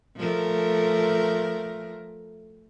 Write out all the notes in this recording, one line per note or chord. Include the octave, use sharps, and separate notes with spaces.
F3 A3 A#4